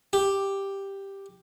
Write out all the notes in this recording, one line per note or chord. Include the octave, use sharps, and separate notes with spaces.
G4